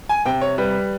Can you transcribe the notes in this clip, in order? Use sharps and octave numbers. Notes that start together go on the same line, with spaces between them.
G#5
C3 G5
C#5
G3 B4